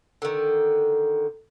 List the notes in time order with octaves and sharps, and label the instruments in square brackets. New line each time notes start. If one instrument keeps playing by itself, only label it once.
[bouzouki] D3 D#3